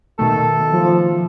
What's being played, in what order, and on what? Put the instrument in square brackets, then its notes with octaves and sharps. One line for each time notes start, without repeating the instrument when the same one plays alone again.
[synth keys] B2 D#3 A3 [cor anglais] A4
[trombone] F3